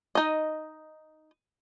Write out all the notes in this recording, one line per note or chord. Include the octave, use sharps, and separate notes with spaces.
D#4 D#5